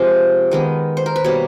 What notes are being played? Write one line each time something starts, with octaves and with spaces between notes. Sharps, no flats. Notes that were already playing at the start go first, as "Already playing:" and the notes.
Already playing: C3 F3 G#3 C5
D#3 G#3 B3
C5
A#4
B4
B2 G3 A#3 C#5